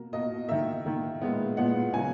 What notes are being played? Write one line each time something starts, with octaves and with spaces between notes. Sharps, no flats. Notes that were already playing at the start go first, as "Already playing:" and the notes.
Already playing: B2 A#3
B2 A#3 D#5
D#3 A#3 E5
D#3 A#3
A#2 G#3 B3
A#2 G#3 B3 F#5
C#3 F#3 A#3 G#5